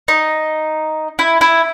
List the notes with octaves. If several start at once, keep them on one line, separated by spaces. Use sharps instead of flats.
D#4
E4
E4